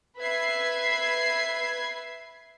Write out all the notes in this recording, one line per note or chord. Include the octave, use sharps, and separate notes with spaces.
B4 E5 G#6 C7